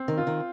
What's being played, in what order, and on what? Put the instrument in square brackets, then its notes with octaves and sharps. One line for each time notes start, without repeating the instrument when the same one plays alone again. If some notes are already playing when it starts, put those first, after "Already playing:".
Already playing: [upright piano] C4
[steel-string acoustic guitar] D#3
[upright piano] F4
[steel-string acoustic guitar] D#3